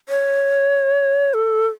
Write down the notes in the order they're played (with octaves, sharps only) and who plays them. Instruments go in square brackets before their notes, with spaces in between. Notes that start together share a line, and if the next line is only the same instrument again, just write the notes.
[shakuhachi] C#5
A4